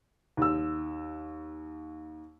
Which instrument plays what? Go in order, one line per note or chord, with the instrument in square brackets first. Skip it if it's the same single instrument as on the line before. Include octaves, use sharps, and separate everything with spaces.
[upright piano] D#2 E6